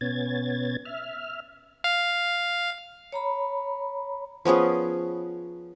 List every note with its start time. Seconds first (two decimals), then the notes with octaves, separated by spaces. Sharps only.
0.01 B2 B3 C#4 G#6 A6
0.85 E5 F6
1.84 F5
3.12 C#5 A#5 B5
4.45 F3 B3 C#4 G#4